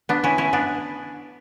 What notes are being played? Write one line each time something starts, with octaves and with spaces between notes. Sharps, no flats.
B3 D4
C#4 E4
C#4 E4
B3 D4